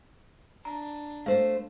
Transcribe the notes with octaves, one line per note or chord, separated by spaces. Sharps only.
D4 A#5
A3 C5 F5